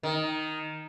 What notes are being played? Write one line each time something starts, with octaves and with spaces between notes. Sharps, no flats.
D#3